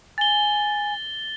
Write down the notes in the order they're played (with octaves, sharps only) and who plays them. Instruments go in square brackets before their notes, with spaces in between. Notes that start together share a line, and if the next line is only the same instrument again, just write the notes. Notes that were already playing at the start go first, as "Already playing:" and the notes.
[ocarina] G#5 [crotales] A6 G7